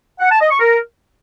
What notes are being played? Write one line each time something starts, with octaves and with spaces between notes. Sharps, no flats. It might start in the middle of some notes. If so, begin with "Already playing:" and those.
F#5
A5
D#5
C#6
A#4